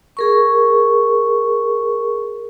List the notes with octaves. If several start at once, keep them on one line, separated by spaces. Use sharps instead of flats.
G#4 A#4 C#6